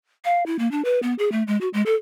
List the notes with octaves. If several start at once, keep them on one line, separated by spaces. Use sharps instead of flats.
F5
E4
A#3
D4
B4
B3
G#4
A3
G#3
F#4
G#3
A4